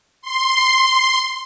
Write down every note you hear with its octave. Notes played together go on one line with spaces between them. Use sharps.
C6